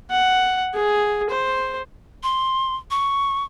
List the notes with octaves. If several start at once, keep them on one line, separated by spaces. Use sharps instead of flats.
F#5
G#4
C5
C6
C#6